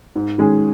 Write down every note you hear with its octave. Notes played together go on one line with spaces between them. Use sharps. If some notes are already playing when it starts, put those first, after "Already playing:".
G#2
D#3 G#3 C#4 G#4